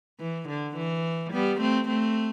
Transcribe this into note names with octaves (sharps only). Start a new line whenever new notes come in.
E3
D3
E3
G3 B3
A3 C4
A3 C4